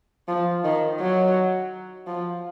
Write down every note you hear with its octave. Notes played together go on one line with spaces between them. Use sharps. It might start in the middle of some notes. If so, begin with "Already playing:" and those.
F3
D#3
F#3
F3